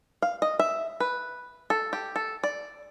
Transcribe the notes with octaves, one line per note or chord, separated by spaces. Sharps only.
F5
D#5
E5
B4
A4
G4
A4
D5